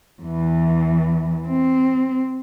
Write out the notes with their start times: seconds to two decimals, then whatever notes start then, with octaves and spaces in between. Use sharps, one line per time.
0.23 E2 E3
1.48 C4